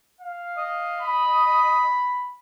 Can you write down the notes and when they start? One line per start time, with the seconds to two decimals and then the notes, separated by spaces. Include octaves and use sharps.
0.20 F5
0.58 D#5
1.00 B5